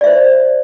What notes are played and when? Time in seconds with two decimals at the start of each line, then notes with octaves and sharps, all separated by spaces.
0.01 D5
0.04 E5
0.07 C5